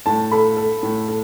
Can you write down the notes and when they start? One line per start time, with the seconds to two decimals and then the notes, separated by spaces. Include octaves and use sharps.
0.06 A2 A5
0.31 A4 B5
0.57 A4
0.83 A2
1.08 A4